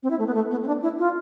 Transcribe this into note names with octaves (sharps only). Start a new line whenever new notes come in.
C4
E4
A3
B3
A3
B3
C4
D4
E4
F4